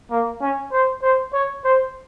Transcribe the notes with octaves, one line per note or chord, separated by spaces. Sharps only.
A#3
C#4
C5
C5
C#5
C5